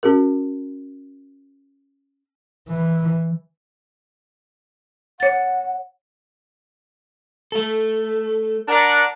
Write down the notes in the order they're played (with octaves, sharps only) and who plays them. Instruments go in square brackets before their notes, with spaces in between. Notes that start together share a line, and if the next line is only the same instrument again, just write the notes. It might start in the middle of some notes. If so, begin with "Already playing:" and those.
[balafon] C#4 F#4 G#4 A#4
[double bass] E3
[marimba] C#5 A6 [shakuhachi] F#5
[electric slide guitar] A3 A4
[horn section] D4 A#4 F#5